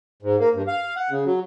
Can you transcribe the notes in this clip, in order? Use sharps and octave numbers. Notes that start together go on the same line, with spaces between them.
G#2
A#3
G2
F5
F#5
C#3
F#3